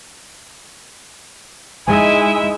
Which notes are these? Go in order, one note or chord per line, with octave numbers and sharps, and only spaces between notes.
G#3 D#4 E4 E5 G#5